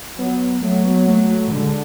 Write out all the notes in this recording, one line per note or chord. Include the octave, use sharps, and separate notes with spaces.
F#3 B3
F#3 A3
B3
A3
A3
D3 G#3